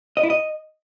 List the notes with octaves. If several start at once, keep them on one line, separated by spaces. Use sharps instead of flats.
D#5
E4
D#5